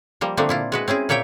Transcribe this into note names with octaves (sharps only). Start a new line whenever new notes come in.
F3 G3 A#3
D3 F3 A3 A#3 C4 D4
A#2 E4 F4
G#3 F#4 B4
C4 C#4 E4 G#4
A#2 A#3 C#5 E5 G5